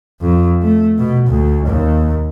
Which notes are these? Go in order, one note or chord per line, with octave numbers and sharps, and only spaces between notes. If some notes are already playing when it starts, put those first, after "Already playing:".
F2
A3
B2
D2
D#2